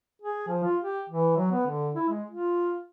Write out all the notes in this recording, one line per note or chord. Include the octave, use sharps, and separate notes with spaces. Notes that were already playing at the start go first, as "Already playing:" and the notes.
G#4
F3
F4
G4
E3
F#3
B3
D3
E4
G#3
F4